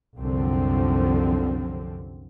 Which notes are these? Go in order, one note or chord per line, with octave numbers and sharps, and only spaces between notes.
C2 F#2 D3 F3 C4